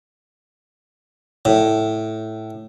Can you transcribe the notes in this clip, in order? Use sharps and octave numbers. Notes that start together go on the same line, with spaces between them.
A2